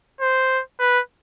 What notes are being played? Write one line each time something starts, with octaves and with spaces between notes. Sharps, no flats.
C5
B4